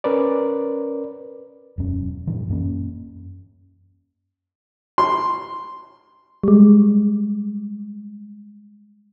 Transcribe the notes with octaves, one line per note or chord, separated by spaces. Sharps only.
C#4 A#4 B4 D5
E1 F#2 C#4
G2 A#2 E3
F#2 A#3 C#4
C6
G3 G#3